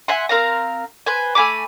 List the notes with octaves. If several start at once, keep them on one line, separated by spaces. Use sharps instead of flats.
E5 F#5 G#5 C6
C4 A#4 F5 A#5
B4 C5 G#5
A3 G#5 B5 D6